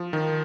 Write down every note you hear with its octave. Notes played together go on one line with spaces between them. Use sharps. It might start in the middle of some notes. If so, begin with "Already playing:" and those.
Already playing: F3
D#3